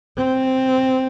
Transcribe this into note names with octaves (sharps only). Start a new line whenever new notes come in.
C4